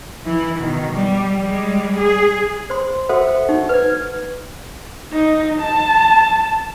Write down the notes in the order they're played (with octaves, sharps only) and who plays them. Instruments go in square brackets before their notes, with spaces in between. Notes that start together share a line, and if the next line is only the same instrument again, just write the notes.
[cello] E3 E4
B2 D#3
G3
G3 G#3
G#4
[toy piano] C5 C6
[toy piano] F#4 A4 C5 [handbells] E5 F#5
[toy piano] D#4 [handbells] F#4
[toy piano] B4 [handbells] F6 G#6
[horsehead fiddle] D#4
A5